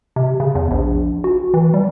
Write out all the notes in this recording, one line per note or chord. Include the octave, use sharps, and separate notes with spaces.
C3
C#3
E2
A#1
F#4
E3
G3